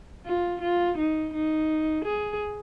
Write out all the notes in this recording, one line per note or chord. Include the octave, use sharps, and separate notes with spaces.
F4
F4
D#4
D#4
G#4